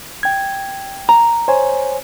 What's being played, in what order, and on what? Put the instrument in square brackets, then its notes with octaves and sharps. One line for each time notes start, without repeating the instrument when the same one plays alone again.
[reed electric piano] G5 G#6
[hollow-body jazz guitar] A#5
[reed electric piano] C5 C#5 G#5